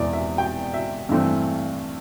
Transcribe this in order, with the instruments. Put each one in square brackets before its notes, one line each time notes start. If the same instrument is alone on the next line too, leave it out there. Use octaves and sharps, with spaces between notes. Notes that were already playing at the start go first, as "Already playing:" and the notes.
Already playing: [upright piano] E1 E2 C3 E3 B3 D5
E5
G5
E5
G2 E3 A3 C4